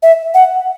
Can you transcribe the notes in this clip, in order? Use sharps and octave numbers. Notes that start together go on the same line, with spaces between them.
E5
F#5